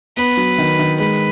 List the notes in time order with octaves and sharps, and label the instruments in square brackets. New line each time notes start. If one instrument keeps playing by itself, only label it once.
[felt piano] B3 [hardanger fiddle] B4
[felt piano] F#3
D#3
D#3
[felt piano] G#3 [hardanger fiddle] B4